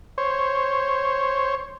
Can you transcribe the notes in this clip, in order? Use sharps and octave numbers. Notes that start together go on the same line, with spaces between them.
C5 C#5